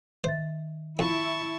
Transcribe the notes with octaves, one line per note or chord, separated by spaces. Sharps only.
D#3 C5 E5 A6
F2 E4 A5 C#6